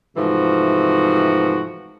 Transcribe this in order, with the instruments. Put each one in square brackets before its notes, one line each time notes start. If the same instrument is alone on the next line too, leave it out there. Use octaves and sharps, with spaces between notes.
[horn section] G#2 C3 E3 F3 A3 F#4